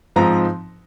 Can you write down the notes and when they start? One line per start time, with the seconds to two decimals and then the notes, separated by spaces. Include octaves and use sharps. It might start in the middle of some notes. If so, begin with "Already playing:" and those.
0.16 G#2 F3 C4 D#4 A#5